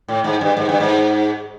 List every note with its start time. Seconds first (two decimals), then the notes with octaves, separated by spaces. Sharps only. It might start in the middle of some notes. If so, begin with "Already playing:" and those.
0.08 A2
0.24 G#2
0.41 G2
0.57 G#2
0.69 G2
0.80 G#2